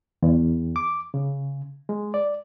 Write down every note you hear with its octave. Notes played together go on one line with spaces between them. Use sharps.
E2
D6
C#3
G#3
D5